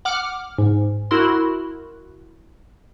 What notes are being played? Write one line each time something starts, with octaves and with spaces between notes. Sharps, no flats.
F#5 D6 F6
G#2
E4 F#4 A#4 C6